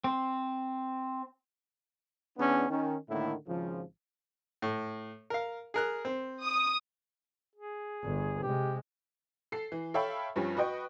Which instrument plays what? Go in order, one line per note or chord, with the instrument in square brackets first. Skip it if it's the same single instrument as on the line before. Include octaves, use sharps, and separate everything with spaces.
[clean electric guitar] C4
[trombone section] E2 B3 C#4 D4
D#3 C#4
A2 D3 D#3 A#3 E4
G#1 C#3 F3
[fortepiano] A2
A#4 F5
G#4 A#4 F#6
C4
[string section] D#6
[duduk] G#4
[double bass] G1
[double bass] C3 G#3 [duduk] G4
[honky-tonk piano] A4 C7
E3
A4 C#5 E5 F5 G5 B5
G2 F3 G3 C#4
F#4 B4 D#5 G5 C#6